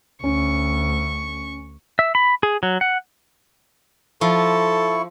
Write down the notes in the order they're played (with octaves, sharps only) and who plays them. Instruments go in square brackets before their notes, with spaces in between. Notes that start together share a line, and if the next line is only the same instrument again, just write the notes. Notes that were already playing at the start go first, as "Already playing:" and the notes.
[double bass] D2 [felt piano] C#4 [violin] C#6
[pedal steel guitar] E5
B5
G#4
F#3
F#5
[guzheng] F3 [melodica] E4 C#6 [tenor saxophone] A4